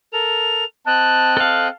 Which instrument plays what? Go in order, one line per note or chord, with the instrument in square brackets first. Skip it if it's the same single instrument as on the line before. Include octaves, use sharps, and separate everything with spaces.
[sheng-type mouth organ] A4 A#4 [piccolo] F7
[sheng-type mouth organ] C4 D#5 G5 [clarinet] A5 [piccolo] F#6
[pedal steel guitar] A4 F5